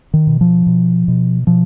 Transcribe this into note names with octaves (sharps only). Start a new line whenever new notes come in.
D#3
B2
F3
B2
B2
B2 F3